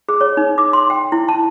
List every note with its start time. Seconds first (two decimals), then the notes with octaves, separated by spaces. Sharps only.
0.09 G#4
0.21 C#5
0.37 D#4
0.58 D6
0.73 C6
0.90 G5
1.12 E4
1.28 A5